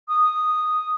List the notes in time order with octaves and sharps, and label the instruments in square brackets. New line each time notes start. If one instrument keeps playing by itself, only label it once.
[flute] D#6